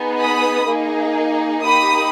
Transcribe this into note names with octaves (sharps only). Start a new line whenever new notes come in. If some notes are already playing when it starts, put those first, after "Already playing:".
Already playing: B3 D#4 G#4
B5 D#6
A#3 D#4 G#4
A#3 D#4 G4 B5 D#6